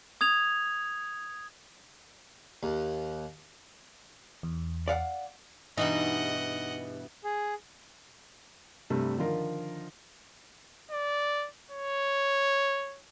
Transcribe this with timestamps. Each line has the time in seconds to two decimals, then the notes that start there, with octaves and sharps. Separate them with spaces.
0.21 D#6 G#6 F7
2.63 D#2
4.43 E2
4.88 D5 F5 F#5
5.78 G2 B2 E3 D#4 D#5 F#5
7.24 G#4
8.90 G2 C3 G3 A3
9.17 D3 D#3 F3 F4 A#4
10.91 D5
11.71 C#5